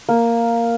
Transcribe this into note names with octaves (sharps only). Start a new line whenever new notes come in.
A#3